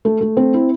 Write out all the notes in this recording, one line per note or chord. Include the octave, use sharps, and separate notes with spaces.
A3
A3
C4
E4